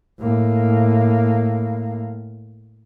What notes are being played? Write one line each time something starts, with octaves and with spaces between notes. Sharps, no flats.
A2 A#3